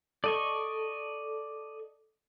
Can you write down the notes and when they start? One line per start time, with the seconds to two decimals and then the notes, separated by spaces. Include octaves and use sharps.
0.24 A4 D5 D#5 C#6